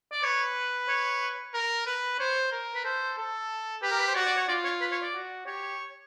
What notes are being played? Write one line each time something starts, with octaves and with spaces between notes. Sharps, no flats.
D5
B4 C#5
C#5
A#4
B4
C5 C#5
A#4
B4
A4 C5
A4
G4 B4
A#4
B4
C5
F#4 D5
D5
C#5
F4 D5
C#5
B4
C#5
D5
F#4
G4 C#5